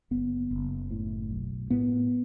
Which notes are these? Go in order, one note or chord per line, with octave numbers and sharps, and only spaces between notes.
F#1 B3
F#1
A2
B1
A2 B3